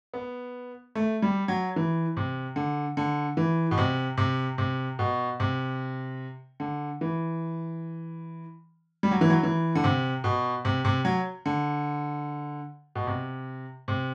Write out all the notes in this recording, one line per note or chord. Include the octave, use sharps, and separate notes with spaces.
B3
A3
G3
F#3
E3
C3
D3
D3
E3
B2
C3
C3
C3
B2
C3
D3
E3
G3
F#3
E3
F#3
E3
D3
C3
B2
C3
C3
F#3
D3
B2
C3
C3